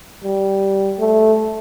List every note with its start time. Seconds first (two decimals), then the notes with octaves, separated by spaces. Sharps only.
0.24 G3
0.99 A3